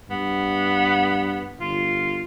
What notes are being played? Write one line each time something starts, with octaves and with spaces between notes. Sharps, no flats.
G2 B3
G1 F4